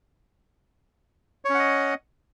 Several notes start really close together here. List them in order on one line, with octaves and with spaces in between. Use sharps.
C#5 C#4 F#5 D#5